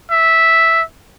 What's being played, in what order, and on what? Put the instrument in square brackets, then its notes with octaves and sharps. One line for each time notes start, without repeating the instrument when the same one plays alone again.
[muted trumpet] E5